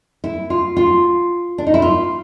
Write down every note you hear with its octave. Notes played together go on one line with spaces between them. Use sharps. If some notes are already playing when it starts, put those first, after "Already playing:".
E4
F4
F4
D4
D#4
E4
F4